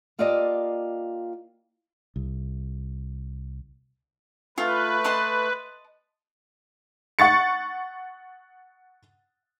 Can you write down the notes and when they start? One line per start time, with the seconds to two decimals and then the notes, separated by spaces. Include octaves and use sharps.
0.19 A#3 F4 G4 A4 D5 D#5
2.16 C2
4.58 A3 F4 B4
5.04 D#5 A5 C6
7.19 F#5 C#6 A6 C#7